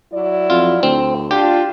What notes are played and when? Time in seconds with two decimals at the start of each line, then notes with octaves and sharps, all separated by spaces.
0.12 F#3 E4 D5
0.50 F2 F4
0.83 D2 C4
1.31 D4 F4 G4